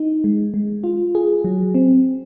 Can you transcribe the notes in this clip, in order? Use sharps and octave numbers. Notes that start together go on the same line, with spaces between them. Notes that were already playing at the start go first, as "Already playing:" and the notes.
Already playing: D#4
G#3
G#3
F4
G#4
F#3
C4